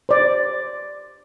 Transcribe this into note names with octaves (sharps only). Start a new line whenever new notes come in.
C5 D5